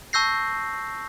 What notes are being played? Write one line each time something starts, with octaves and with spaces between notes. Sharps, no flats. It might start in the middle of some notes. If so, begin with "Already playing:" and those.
A5 C#6 E6 G6 A#6 C7